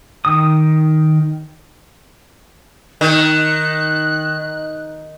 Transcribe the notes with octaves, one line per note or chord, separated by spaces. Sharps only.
D#3 D#6
D#3 F#6